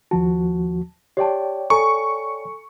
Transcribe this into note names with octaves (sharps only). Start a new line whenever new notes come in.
D#2 F3 F#4 A5
G4 C#5 D5 G5 A5
A4 G#5 A#5 C#6